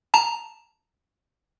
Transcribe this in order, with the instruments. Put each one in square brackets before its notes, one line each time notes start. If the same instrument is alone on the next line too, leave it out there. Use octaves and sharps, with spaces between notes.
[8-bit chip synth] A5 A#5